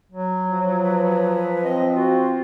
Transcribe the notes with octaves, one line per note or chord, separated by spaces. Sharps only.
F#3
F3
B4
C4 D#5
F4 F#4